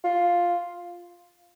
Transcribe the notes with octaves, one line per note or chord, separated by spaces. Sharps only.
F4